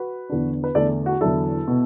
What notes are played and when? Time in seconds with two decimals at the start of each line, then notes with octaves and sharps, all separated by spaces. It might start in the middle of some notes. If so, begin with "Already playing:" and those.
Already playing: F#4 B4
0.29 E2 D3 B3 D4
0.64 B4
0.75 E2 D3 A3 D4 A4 D5
1.06 F#4
1.21 E2 D3 F#3 D4 E4 A4
1.68 B2 B3